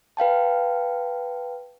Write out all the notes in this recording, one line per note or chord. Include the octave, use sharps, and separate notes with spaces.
B4 F5 G5 A5